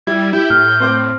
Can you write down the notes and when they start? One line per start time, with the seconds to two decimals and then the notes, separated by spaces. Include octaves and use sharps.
0.07 G3 E4 G#6
0.33 E4 G4 G6
0.50 A2 F6
0.80 C4 C5 D6